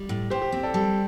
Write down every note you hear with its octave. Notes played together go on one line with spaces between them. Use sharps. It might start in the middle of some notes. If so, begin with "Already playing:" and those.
Already playing: G3
A2
A2 G4 C5
G4
C4
A4 D5
G3 A4